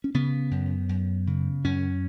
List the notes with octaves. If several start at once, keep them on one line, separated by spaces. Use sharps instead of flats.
C#4
C#3 B3
F#2
F#2
C#3
F#2 C#4